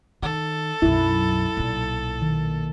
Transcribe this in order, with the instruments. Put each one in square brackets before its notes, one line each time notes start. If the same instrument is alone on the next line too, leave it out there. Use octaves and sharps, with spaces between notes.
[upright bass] D#3 [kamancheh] A4
[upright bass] B1 F#2 [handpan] E4
[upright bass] B1 A#2
[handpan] D#3